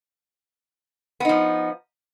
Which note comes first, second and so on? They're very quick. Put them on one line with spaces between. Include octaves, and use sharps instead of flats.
B3 D#4 F3